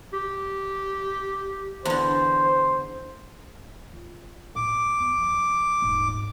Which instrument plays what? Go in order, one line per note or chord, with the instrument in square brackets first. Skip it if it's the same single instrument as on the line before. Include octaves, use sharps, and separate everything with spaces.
[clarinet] G4
[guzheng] E2 D3 [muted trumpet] C5
[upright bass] F4
[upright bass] A2 [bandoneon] D6
[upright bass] E2
F3
D#1 G#2